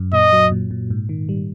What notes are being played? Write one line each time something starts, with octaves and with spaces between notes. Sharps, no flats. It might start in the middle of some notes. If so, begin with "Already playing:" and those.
Already playing: F#2
A#2 D#5
F#3
A#2
A#2
G#2
D#3
G3